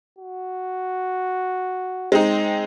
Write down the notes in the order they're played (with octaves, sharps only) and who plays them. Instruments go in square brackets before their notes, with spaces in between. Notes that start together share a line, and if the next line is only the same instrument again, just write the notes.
[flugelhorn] F#4
[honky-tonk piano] G#3 C4 D#4 [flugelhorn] C5